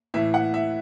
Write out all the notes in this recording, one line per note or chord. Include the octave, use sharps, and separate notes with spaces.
A2 E3 E5
F#5
E5